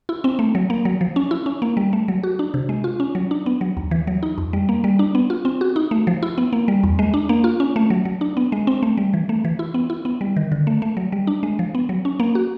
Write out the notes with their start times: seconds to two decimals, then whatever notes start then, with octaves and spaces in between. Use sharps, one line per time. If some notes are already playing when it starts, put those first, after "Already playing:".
0.09 E4
0.24 C4
0.39 A3
0.55 F#3
0.70 A#3
0.85 F#3
1.01 F3
1.16 C#4
1.31 E4
1.46 C#4
1.62 A#3
1.77 G3
1.93 A3
2.08 F#3
2.23 F#4
2.39 D4
2.54 C3
2.69 G#3
2.84 F4
3.00 C#4
3.15 F#3
3.31 D4
3.46 B3
3.61 F#3
3.77 D#2
3.91 E3
4.07 F#3
4.23 D#4
4.38 F2
4.53 G3
4.69 A#3
4.84 G3
4.99 D4
5.15 B3
5.30 F4
5.45 C4
5.61 F#4
5.76 D#4
5.91 A3
6.07 F3
6.23 E4
6.38 B3
6.53 A#3
6.68 G3
6.83 E2
6.99 G#3
7.14 D4
7.29 A#3
7.44 F4
7.60 C#4
7.76 A3
7.90 F#3
8.05 F#3
8.21 D4
8.37 B3
8.52 G#3
8.67 C4
8.83 A3
8.97 G3
9.14 E3
9.29 A3
9.45 E3
9.59 E4
9.74 B3
9.90 E4
10.05 B3
10.21 G3
10.36 D#3
10.52 D3
10.67 A3
10.82 A3
10.97 F#3
11.12 G3
11.27 D4
11.43 G#3
11.59 F3
11.75 B3
11.89 F#3
12.05 C#4
12.20 A#3
12.35 F#4